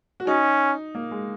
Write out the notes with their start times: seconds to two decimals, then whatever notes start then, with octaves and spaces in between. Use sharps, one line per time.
0.20 F#4
0.27 C#4 D#4
0.95 A#3
1.11 G#3